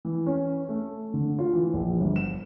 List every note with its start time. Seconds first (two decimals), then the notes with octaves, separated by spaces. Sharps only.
0.05 E3
0.26 C#4
0.69 A3
1.14 D3
1.39 F4
1.53 E3
1.74 A#1
2.00 G1
2.16 E7